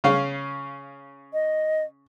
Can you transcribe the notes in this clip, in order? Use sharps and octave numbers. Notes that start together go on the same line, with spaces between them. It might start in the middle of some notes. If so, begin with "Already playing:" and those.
C#3 C#4 F5
D#5